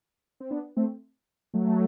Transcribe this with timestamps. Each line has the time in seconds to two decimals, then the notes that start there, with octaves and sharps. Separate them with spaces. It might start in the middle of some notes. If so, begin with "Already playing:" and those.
0.40 C4
0.51 B3 D4
0.76 A3 C4
1.54 F#3 A3